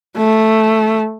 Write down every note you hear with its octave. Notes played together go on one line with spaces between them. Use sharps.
A3